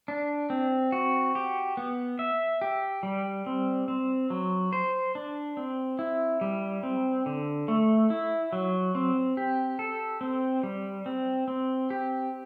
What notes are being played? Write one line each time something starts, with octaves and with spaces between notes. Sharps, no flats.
D4
C4
F#4
G4
B3
E5
G4
G3
C4
C4
F#3
C5
D4
C4
E4
G3
C4
D3
A3
E4
F#3
C4
G4
A4
C4
G3
C4
C4
G4